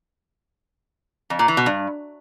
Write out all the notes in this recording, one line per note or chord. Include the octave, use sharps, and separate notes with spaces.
F2
A#2
E3
B2
G2